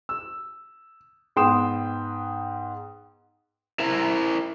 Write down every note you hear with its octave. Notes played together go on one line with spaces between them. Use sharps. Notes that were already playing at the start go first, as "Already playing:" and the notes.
E6
G#2 B3 G5 C6 D#6 E7
E4 A#4 C5 E5 A#5